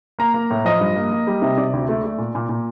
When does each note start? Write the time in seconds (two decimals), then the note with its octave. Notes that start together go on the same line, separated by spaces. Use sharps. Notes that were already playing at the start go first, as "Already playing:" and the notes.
0.19 A#3 A#5
0.34 A#3
0.50 A2
0.65 F3 D#5
0.80 G2
0.96 A#3
1.12 A#3
1.27 G3
1.42 C3
1.57 C3 D5
1.73 D2
1.89 A3
2.04 A3
2.18 A#2
2.35 A#2
2.49 A#2